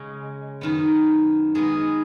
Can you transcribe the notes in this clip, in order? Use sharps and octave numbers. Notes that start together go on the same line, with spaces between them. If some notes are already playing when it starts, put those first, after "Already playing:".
Already playing: C#3 G#3 C#4
F#2 D#3 B3
D#3 G#3 B3 G#4